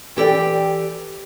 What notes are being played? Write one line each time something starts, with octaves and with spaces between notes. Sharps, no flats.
E3 G4 A4 D5 G5